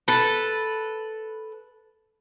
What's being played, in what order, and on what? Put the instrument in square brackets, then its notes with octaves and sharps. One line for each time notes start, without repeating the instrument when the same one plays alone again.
[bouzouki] A4 B4